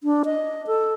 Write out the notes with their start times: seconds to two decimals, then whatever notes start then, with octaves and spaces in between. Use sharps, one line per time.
0.04 D4
0.25 D#5
0.67 A4